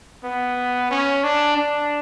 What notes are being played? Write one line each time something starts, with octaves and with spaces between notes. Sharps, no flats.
B3
C#4
D4
D4